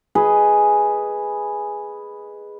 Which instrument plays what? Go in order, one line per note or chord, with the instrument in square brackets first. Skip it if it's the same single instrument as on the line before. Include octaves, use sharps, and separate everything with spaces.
[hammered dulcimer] G#4 B4 D#5